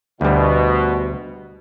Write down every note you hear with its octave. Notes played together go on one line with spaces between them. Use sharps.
D2 B2 G3